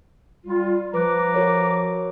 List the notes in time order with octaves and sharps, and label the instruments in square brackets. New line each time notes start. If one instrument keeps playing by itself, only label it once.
[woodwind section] G3 F4
[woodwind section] F3 A#5 D6 [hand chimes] B4 F#6
[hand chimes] F#4 A#4 C#5